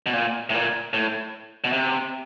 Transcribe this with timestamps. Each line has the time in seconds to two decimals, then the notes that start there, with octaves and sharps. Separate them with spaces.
0.06 B2
0.13 A#2
0.50 A2
0.54 A#2
0.93 A2
1.64 B2
1.73 C3